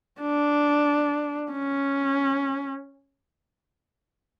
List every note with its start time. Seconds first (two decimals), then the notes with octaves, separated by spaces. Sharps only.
0.21 D4
1.51 C#4